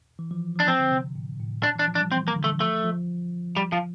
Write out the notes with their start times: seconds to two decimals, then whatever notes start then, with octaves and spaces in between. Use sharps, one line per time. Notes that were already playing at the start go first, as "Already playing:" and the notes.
0.19 E3
0.31 F3
0.56 F3
0.60 D4
0.67 F3 C4
0.80 D3
0.91 C3
1.15 A2
1.40 A2
1.63 A#2 D4
1.76 E3
1.79 D4
1.88 F3
1.95 D4
2.00 G3
2.11 E3 C4
2.28 A#3
2.36 D3
2.44 A3
2.60 F3 A3
2.84 F3
3.57 G3
3.72 F3